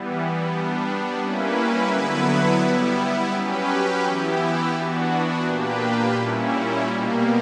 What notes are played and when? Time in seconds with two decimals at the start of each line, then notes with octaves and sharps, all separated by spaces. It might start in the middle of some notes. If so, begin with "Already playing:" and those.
Already playing: E3 G3 B3
0.48 G3 B3 D4
1.19 G3 A#3 C#4 E4 B4
1.89 D3 F#3 B3 E4 B4
2.61 G3 B3 E4
3.31 F#3 C#4 G4 B4
4.03 E3 B3 E4 G4
4.73 E3 B3 D4 F#4
5.44 A#2 A#3 D4 G4 B4
6.15 A#2 G3 C#4 E4
6.85 B2 G3 A#3